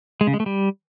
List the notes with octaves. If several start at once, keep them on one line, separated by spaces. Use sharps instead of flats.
G#3
C#3
G#3
A3
G3